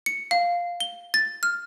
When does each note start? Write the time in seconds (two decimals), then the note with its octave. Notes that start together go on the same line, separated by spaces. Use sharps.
0.06 C#7
0.31 F5
0.80 G7
1.14 A6
1.43 F6